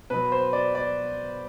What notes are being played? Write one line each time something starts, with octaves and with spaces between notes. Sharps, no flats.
B2 F#3 B4
C5
D5
D5